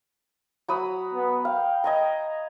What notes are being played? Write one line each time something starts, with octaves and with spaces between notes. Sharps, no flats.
F#3 B5 D#6
B3
F5 G5
D#5 G#5 A#5